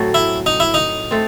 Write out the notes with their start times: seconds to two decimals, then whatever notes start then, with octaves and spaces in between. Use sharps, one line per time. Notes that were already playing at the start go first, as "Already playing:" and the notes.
Already playing: A2 F#3 A3 C4
0.14 E4
0.46 D#4
0.60 E4
0.74 D#4
1.11 A3 C4